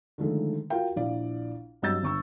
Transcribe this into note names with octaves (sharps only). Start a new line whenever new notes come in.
D3 D#3 F3 G#3 A3
F4 F#4 A#4 F5 G5
A#1 E4 D5 F5
G2 F#3 D#5 E6 G6 A6
G1 C#6 E6